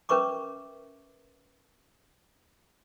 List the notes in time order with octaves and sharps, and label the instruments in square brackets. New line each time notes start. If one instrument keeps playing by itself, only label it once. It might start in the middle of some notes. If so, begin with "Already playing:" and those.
[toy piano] C#4 A#4 B4 E5 C#6 D6